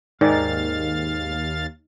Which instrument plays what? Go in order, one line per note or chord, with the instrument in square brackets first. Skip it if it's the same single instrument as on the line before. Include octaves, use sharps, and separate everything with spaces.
[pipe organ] D#2 F5 A6 [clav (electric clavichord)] G#2 D#3 [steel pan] D#4 D5 G#5